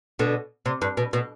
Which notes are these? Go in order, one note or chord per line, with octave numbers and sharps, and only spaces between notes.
B2 D3
C3
G2
B2
B2